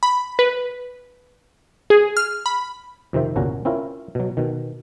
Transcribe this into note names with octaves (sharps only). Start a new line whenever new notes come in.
B5
B4
G#4
F6
B5
F2 C3 D#3 C5 E5
G1 C2 A#2 C#4 F#4 A#5
C4 C#4 E4 F4 A#4
B2 F#3
B2 D#3